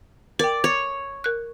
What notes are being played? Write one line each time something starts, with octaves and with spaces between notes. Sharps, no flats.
A#4 D5 G5
C#5
A#4 F#6